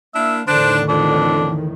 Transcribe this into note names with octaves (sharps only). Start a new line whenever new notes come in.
A#3 D4 E4 E5 F5
E2 A2 D3 D#3 D4 C5
F2 D4